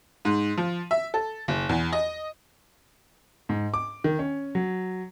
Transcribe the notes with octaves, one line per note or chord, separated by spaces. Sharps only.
G#2
F3
E5
A4
F#1
E2
D#5
G#2
D6
D#3
C#4
F#3